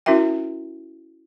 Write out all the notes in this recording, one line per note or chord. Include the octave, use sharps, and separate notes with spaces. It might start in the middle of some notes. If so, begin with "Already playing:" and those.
C#4 E4 F#4 A#4 E5 G5